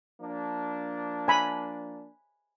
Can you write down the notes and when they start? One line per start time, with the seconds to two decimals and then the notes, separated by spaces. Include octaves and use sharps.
0.21 F3 A#3 D4
1.28 G#5 B5